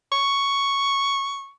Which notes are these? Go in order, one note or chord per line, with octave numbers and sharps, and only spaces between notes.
C#6